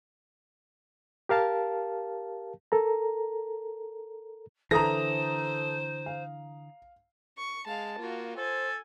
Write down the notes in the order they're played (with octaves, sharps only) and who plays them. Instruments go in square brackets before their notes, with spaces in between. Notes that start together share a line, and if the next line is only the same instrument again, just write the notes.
[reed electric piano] G4 A#4 F5 A5
A4 A#4 A#5
[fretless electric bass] D3 E3 [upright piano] A4 [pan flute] C5 [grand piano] A#5 D#6 A#6
[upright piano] F5
[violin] C#6
[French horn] G#3 [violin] F5 A5
[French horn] A#3 [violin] F4 F#4
[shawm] A4 [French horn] C5 [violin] G#5